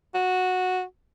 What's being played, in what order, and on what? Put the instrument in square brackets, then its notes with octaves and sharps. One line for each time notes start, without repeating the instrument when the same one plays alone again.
[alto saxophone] F#4